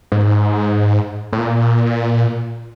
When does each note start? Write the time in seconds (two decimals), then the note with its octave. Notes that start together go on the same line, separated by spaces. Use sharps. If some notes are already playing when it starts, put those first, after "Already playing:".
0.12 G#2
1.33 A2
1.38 A#2